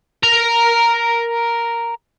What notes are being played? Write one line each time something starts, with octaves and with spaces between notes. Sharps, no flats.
A#4 A#5